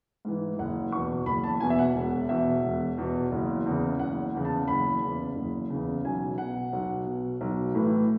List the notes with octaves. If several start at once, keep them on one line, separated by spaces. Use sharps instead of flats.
G#2 E3
F#1 F#5
E2 B2 C#6
F#1 B5
A5
E2 B2 G#5
E5
F#5
E1
E2 B2 E5
E1
E2 B2
F#1
E2 C#3
F#1 F#5
E2 C#3
A5
F#1 B5
E2 C#3
F#1
E2 C#3
B1 G#5
B2 F#5
B1
B2
B1
A2 E3